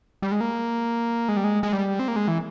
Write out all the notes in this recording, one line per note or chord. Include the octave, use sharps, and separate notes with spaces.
G3
G#3
A#3
G#3
G3
G#3
G#3
G3
C4
A#3
G#3
E3